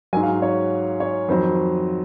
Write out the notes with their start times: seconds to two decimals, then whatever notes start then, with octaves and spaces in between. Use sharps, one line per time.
0.13 F#3 G#5
0.17 G#2
0.23 F5
0.42 C#5
1.00 C#5
1.28 F2 D#3 F#3 C5